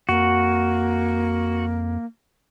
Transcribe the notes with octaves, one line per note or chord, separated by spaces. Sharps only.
F2 A#3 F#4